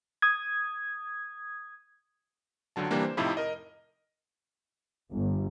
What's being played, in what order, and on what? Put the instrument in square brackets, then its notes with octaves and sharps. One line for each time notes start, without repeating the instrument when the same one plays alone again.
[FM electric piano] D#6 G#6
[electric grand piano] C#2 D3 F#3 A5
C3 E3 G3 A#3 D4
C5
F2 A2 C3 F3 D#4 E4
A#4 D#5
[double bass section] G1